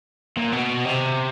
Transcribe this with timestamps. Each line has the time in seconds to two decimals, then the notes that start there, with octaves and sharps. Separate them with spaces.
0.37 A#2
0.52 B2
0.85 C3